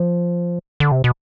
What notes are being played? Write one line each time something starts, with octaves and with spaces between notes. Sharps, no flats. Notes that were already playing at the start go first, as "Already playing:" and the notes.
Already playing: F3
D3
C3
B2